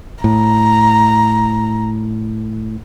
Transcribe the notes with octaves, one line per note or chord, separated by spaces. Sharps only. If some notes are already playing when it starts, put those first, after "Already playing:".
A2 A#5